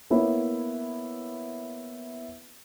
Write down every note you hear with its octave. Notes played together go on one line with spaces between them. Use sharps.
A#3 B3 E4 C#5